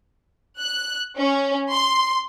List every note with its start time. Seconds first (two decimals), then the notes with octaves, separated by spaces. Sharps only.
0.60 F#6
1.18 C#4
1.71 C6